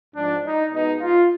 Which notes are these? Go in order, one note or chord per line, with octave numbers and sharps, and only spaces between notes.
G#2 F3 G#3 D4
D#4
B2 G#3 B3 D#4
F4